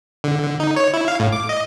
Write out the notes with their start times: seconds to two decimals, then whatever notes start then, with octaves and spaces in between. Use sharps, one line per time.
0.24 D3
0.43 D3
0.60 D#4
0.76 C#5
0.94 E4
1.08 F5
1.20 A2
1.32 D6
1.49 D#5